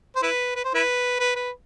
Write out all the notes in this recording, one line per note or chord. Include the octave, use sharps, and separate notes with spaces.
C5
E4 B4
B4
C5
E4 B4
B4
B4